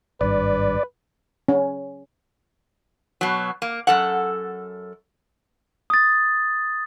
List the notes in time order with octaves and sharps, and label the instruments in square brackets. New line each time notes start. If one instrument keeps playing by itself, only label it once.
[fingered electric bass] G#1 G2 [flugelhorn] B4 [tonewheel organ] D5
[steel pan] C#4
[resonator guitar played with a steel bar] B2 F#3
A#3
F#2 A4 F#5
[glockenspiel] D#6 A6